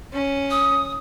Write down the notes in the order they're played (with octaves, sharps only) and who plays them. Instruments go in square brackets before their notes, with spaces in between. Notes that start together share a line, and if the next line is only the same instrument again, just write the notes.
[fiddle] C#4
[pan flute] D#6